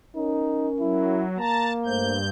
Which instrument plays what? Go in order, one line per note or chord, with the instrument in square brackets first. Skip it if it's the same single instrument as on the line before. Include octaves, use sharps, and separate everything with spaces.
[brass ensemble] C#4 A#4 [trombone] D#4
[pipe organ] F#3 [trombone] E4
[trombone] A#3 [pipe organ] A5 [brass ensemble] A#5
[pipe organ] G2 G6 [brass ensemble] A3 C5